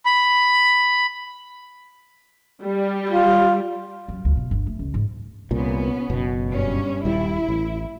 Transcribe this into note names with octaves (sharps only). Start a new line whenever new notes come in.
B5
G3
F4
F#2
D2
B2
G1
A3
C#2
G#2
C2 A#2 B3 C#4
F#1 B2
G2 C#4
D#1 G3 E4
A1